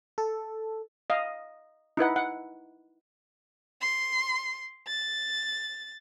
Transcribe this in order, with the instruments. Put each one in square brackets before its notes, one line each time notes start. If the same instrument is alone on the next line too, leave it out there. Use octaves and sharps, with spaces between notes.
[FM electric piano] A4
[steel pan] D#5 F5
D#4 E4 B4 F#5
F#5
[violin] C6
A6